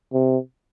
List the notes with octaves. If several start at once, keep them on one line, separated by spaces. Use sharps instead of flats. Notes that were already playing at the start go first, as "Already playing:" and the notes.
C3